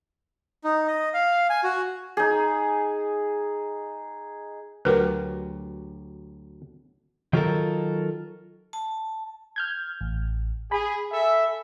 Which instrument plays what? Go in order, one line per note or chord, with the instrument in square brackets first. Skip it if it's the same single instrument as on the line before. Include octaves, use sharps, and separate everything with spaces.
[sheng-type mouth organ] D#4
D#5
F5
G#5
F#4
[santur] D#4 G#4
[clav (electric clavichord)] D2 F#3 G4 [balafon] A#4 B4
[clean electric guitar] D#3 F#3 F4 G4 A4 A#4
[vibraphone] A5
[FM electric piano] F6 G6 G#6
A1
[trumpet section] G#4 [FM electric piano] G#5 B5
[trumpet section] A4 E5